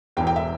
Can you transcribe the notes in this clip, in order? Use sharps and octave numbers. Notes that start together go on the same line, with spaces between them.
E1 E2 E3 G5
G5
E5